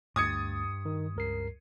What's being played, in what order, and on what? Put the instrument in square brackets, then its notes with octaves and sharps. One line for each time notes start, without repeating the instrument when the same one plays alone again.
[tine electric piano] D2 A6 [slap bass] G2 [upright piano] D#6 G#6 C#7
[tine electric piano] D#3
C#2 A#4 C7